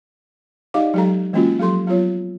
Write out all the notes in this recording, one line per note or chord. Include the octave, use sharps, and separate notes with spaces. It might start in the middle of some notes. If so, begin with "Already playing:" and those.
D#4 G4 D5 D#5 F5 D6
F#3 G#3 G4 A4 A#5
E3 G#3 A#3 C#4 F4 F#4
F3 F#3 G4 A4 C6
F#3 B3 F4 C#5